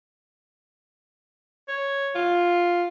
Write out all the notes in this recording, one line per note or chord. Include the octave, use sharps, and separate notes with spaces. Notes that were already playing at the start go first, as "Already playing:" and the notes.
C#5
F4